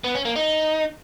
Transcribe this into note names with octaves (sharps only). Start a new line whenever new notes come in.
B3
C#4
A#3
D#4